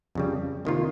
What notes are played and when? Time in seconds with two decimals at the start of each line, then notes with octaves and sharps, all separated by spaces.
0.15 F2 C#3 G3
0.65 C3 D#3 A#3 F4